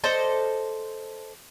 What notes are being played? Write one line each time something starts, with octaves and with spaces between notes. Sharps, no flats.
A4 C5 D5 D#5